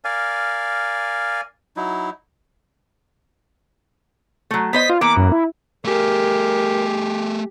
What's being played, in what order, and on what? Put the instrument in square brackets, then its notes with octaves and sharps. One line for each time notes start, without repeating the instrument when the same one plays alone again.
[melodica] A#4 D5 F5 G#5
F#3 D#4 E4
[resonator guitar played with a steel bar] F#3 A3
[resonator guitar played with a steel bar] B3 C5 D#5 [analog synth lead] B6
[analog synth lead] F4
[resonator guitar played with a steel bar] E3 A#3 B3 [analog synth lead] D6
[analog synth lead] F#2
E4
[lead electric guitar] A3 G#4 [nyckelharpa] G4 [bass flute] A#4